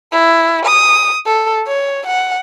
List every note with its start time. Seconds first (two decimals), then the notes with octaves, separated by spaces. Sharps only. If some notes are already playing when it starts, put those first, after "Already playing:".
0.12 E4
0.65 D#6
1.26 A4
1.67 C#5
2.07 F#5